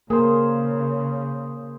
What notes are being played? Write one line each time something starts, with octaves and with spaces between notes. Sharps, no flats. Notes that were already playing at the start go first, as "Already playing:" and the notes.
C#3 A#3 G#4 A#4 C5